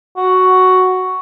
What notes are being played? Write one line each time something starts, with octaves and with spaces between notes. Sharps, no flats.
F#4